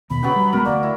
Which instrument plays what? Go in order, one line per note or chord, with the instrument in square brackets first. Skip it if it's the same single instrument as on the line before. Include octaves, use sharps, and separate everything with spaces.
[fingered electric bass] D#2 B2 [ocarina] B5
[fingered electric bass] C#3 [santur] F#3 B3 G5
[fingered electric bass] G3
[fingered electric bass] F1 G#3 B3 [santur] F#4 A#4
[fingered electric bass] D2 [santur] A#3 [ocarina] D5
[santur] E4